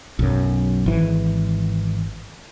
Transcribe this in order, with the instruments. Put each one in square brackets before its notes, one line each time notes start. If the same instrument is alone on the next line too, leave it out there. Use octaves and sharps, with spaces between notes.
[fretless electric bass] B1 F#2
G#1 E3